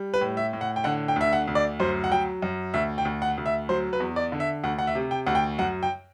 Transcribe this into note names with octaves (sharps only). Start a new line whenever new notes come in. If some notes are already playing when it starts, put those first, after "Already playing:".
Already playing: G3
B4
A2
E5
A2
F#5
G5
D3 F#5
G5
D2 E5
F#5
D2
D5
F#2 C5
F#5
F#3 G5
F#2
D2 E5
G5
D2
F#5
D2
E5
F#3 C5
B4
E2
D5
D3
E5
D2 F#5
F#5
E5
C3
G5
D2 F#5
G5
F#2 F#5
G5